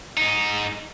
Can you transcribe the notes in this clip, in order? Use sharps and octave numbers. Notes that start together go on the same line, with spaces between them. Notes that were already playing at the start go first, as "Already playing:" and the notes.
G#2 D#4